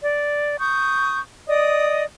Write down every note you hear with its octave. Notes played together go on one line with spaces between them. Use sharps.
D5
C#6 D#6 G6
D5 D#5 D#6